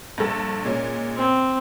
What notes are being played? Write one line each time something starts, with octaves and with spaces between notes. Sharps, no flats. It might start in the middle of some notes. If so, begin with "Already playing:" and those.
A#1 G2 A4
A#2 G#3 C#4
C4